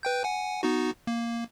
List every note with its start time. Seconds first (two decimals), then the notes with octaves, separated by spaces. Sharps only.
0.03 B4 G5 G6
0.24 F#5 G#5
0.63 B3 D#4 F#4
1.07 A#3